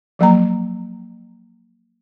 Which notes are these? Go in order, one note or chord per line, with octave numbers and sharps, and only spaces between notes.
F3 F#3 A#3 A#5